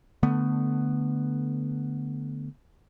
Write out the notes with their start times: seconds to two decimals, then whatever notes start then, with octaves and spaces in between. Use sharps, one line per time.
0.23 D3 A3 B3